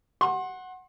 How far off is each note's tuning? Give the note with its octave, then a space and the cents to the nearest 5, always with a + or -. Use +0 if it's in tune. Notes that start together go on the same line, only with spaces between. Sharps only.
F#5 +0 C6 +35